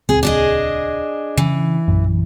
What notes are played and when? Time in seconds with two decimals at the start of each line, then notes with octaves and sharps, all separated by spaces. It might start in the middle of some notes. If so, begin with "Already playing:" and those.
0.09 D#1 C#2 C4 G#4
0.23 D4 G#4 D#5
1.37 C#3 E3
1.88 A#1 F#2